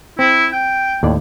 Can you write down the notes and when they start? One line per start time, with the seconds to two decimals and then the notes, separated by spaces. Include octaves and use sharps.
0.19 C4 E4
0.53 G5
1.03 D#2 A2 D5